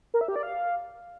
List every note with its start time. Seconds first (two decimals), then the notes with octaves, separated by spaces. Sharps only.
0.14 A#4
0.21 E5
0.28 G4
0.36 D5
0.43 F5